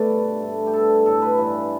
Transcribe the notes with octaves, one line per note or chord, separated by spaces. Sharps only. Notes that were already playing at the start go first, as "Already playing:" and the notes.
Already playing: B2 A3 B4 D5
G2 G3
G2 D3 A3
G4
B2 G3 A4
A2 A3 A4
B4
G2 E3 G3